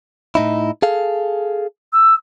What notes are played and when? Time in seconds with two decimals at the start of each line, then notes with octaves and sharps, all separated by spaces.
0.35 A2 D#4 E4
0.82 G#4 A4 F5
1.93 E6